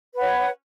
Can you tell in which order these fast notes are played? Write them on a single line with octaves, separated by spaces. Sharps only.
B4 F#5 C#5